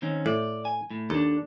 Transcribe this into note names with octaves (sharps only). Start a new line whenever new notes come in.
D#3 C4 C#4
A2 D5
G#5
A2
D#2 D4 A4